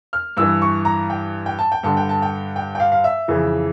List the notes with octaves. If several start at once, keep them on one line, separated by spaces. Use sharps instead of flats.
F6
G2 E3 E6
C#6
A#5
G5
G5
A5
G5
G2 D3 A5
G5
A5
G5
G5
G5
F5
F5
E5
F2 C#3 E3